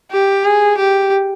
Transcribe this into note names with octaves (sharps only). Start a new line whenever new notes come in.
G4
G#4
G4